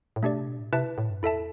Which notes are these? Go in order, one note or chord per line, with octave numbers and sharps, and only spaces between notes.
A2
B2 A3 D4 G4 D5
C3
B2
A2
C3 E4 B4 E5 A5
A2
G2
E2 E4 A4 E5 A5